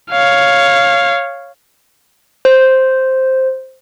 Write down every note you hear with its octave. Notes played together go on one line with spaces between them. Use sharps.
C#5 F5
C5